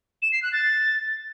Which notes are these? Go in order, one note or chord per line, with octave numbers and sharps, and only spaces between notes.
E7
C7
F#6
A6